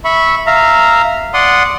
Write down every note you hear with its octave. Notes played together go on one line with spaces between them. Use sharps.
E5 B5 C#6
E5 F5 A#5
D5 F#5 C6 D#6